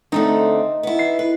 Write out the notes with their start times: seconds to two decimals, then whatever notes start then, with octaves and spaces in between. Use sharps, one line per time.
0.12 D3 A3 C4 D#4
0.83 B3 E4
0.99 C7
1.19 B4